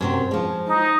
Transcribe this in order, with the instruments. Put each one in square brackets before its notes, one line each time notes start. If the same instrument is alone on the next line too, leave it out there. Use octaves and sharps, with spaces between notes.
[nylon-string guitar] F#2 C3 C4
F3 G#3
[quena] D#4